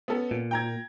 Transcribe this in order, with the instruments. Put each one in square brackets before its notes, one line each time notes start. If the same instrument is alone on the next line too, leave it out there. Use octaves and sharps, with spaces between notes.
[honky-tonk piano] B3 C#4 A4
[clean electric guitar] A#2
[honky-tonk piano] G5 A#5 G#6